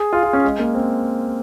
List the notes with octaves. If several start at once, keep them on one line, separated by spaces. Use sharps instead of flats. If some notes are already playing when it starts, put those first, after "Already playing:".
Already playing: G#4
F4
F4
C#4
G#3
A#3
C4